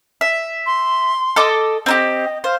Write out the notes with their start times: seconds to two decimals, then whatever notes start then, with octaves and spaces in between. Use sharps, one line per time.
0.21 E5
0.66 C6
1.36 A4 D#5 D6
1.86 C4 D#4 G4 D#5
2.44 C5 F5